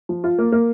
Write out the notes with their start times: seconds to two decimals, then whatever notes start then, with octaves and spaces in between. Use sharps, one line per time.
0.09 F3
0.24 F4
0.39 A#3
0.52 A#3